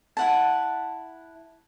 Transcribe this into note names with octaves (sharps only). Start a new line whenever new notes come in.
E4 F#5 A5